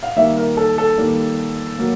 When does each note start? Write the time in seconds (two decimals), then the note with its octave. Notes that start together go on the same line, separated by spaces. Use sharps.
0.03 F5
0.16 D#3 G3 A#3 E5
0.37 A#4
0.57 A4
0.78 A4
0.98 D#3 G3 A#3
1.78 F#3 A#3